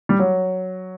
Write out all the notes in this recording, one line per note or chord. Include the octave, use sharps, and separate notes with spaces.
G3
F#3